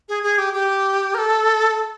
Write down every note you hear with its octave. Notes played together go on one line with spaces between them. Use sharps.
G#4
G#4
G4
G4
A#4
A4